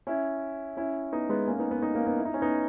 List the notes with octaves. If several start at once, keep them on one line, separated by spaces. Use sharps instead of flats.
C#4 E4
C#4 E4
B3 D#4
G#3 B3
A#3 C#4
B3 D#4
B3 D#4
B3 D#4
A#3 C#4
B3 D#4
E4
D#4
C#4
B3 D#4